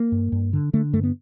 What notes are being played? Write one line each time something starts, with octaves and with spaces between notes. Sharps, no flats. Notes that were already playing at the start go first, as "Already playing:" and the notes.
Already playing: A#3
G2
G2
D3
D3 A3
G2 A3
B3